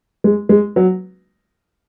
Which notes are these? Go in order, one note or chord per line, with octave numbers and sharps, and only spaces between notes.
G#3
G#3
F#3